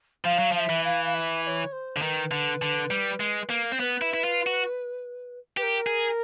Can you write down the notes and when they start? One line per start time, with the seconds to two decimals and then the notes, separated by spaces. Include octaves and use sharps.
0.25 F3 F5
0.39 F#3
0.52 F3 F5
0.59 E5
0.69 E3
0.85 F5
1.05 F5
1.14 E5
1.43 E5
1.47 C#5
1.72 C5
1.97 D3
2.02 D#3 B4
2.31 D3
2.62 D3
2.91 G3
3.20 G#3
3.50 A#3
3.72 C4
3.79 B3 B4 C5
4.02 E4
4.14 E4
4.24 F4
4.47 F#4
5.57 G4 B4
5.62 A#4
5.87 G#4